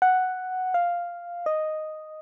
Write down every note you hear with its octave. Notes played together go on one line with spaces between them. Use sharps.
F#5
F5
D#5